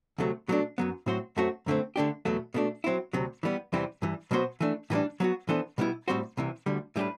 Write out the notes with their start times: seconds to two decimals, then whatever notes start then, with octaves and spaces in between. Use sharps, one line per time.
0.18 D2 C3 F#3 A3
0.48 B2 F#3 A3 D4
0.78 F#2 F#3 B3
1.06 A2 F#3 C4 F#4 C5
1.37 F#2 F#3 A3 C4 F#4
1.66 F#2 D3 A3 C4
1.96 D3 A3 D4 G4
2.25 E2 B2 F#3 A3
2.54 B2 A3 D4
2.84 F#3 C4 E4
3.13 D2 C3 F#3
3.43 E3 G3 B3
3.73 E2 C3 E3 G3 C4
4.02 G2 E3 G3
4.31 B2 F#3 B3 F#4 C5
4.61 E3 A3 D4
4.90 A2 E3 G3 D4
5.20 F#3 B3 F#4
5.49 E3 B3 D4 A4 C5
5.78 B2 G3 B3 E4
6.08 A2 G3 C4 F#4 C5
6.37 C2 C3 E3
6.66 D2 D3 G3
6.96 A2 G3 D4 G4 B4